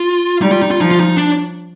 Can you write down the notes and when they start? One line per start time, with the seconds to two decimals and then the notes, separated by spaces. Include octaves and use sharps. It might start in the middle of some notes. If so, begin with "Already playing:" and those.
Already playing: F4
0.42 G3 D#4
0.52 F4
0.62 D#4
0.71 F4
0.80 F3 D#4
0.91 F4
1.00 D#4
1.17 D4